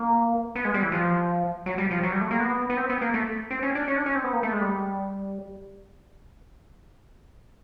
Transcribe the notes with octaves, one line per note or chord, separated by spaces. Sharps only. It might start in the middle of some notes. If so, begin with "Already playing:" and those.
Already playing: A#3
B3
G#3
G3
E3
F3
F#3
G3
F3
F#3
G3
A3
A#3
B3
B3
C4
B3
A#3
A3
C4
C#4
D4
C#4
D4
C#4
C4
B3
A#3
A3
G#3
G3